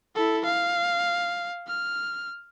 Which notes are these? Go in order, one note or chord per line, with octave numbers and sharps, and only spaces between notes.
E4 A4
F5
F6